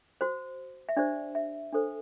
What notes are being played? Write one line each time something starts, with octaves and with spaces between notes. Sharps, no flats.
F#4 C5
E5
D4 G4 C5 D5
E5
D4 A4 C5